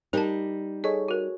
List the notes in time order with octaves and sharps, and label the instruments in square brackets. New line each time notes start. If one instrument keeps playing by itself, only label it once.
[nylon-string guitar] G3 D#4 [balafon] A#4 A5
[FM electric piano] G#4 A4 C#5 [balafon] D#5
[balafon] F#4 A#4